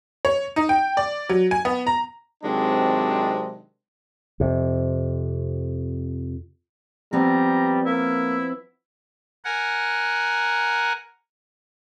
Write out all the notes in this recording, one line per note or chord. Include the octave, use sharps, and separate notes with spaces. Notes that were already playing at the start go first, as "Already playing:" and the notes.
C#5
D#4
G5
D5
F#3
G#5
B3
A#5
C3 D#3 F#3 G#3 C4 D4
F2 C3
F3 G3 B3 C4 A#5
A#3 E4
A#4 F#5 G#5